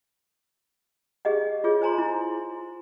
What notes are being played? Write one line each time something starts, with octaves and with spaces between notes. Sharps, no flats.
G4 G#4 D#5 F#5
F4 G#4 C#5
C5 G#5 A#5 C6
E4